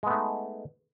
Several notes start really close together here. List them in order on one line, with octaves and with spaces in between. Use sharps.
G#3 B3 A3 D#4